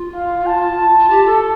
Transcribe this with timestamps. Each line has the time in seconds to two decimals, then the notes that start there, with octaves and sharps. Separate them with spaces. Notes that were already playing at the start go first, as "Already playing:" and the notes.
Already playing: F4
0.15 F5
0.47 A5
0.99 F4
1.10 G4
1.26 A4